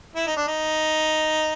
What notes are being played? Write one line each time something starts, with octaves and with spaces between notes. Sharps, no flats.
E4
D#4
D4
D#4